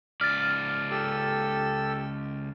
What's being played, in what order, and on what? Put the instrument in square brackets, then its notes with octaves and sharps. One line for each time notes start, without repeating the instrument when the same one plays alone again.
[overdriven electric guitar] C#2 D5 [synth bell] F6 A6
[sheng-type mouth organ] G4 A4 E6